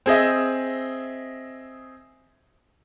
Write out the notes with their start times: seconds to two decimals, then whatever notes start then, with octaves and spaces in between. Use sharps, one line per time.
0.06 C4 G#4 D#5 E5